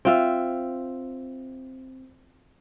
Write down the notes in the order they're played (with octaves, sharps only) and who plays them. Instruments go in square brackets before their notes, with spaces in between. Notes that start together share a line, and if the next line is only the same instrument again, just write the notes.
[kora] C4 F4 E5